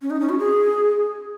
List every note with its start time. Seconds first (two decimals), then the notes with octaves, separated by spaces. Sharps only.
0.02 C#4
0.10 D#4
0.20 C#4
0.29 F#4
0.39 G#4